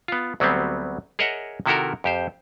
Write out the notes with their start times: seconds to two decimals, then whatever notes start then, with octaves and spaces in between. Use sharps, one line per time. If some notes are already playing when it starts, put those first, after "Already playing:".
0.08 B3 F4
0.40 D2 F#3 G3 B3 C4
1.19 G#4 A#4 C#5 D#5 E5 F#5
1.66 C3 D#3 E4 F#4 A4 A#4
2.04 F2 G4 C5